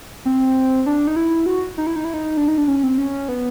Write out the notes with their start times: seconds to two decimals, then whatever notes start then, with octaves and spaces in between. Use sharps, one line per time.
0.25 C4
0.86 D4
1.07 D#4
1.16 E4
1.46 F#4
1.78 D#4
1.87 E4
1.96 D#4
2.05 E4
2.14 D#4
2.37 D4
2.48 D#4
2.58 D4
2.68 C#4
2.83 C4
2.98 C#4
3.29 B3